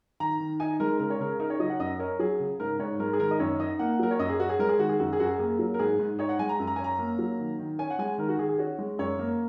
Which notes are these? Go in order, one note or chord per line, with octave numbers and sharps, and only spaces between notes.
D#3 A#5
D#3
D#4 G#5
G#3 A#4
C#3 A#4
C#5
C#3 A#4
D#4 A#4
C#5
F#3 D#5
F#5
F#2 D#5
C#4 A#4
F#3 G#4
C#3
G#2 A#4
G#2 C#5
G#3 A#4
G#4
D#3 A#4
D#5
F#2 C#5
D#4 D#5
A#3 F#5
F#3 A#4
C#5
F#2 D#5
G#4
C#4 F#4
G#4
G#3 A#4
G#4
D#3 F#4
G#4
F#2 F#4
G#4
F#2 F#4
G#4
A#3 G#4
F#3
A#4
G#2 G#4
G#2
D#4 C#5
F#5
G#3 G#5
A#5
F#2
A#5
C#4 G#5
A#5
A#3
F#3
D#3
D#3
C#4 G#5
F#5
G#3 G#5
D#3 A#4
F#4
D#3 G#4
G#4
C#4 F#4
G#3
F#2 C#5
A#3